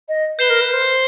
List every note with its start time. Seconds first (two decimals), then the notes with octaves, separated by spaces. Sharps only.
0.09 D#5
0.39 B4 G6 C7 E7 G7
0.50 A#4
0.61 B4
0.73 C5